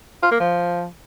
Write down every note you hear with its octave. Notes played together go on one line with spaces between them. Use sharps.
F4
A#3
F3